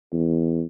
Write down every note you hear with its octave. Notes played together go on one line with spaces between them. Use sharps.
E2